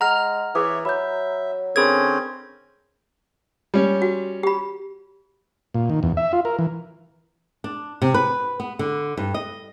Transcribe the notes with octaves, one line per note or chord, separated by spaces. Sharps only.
G#3 F#5 A#5 F6 F7
E3 G#4 C#5 E5 D6 D#6
F#3 E5 B5 G6
D3 C4 C#4 G#4 A#4 B5 G#6
G3 C#4
F#4
G4 B5
A#2
D#3
E2
E5
F4
A#4
E3
D4
C3
B4
B3
D3
G2
D#5